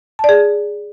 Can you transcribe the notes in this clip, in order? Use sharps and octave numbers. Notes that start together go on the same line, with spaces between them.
G#4 D5 A5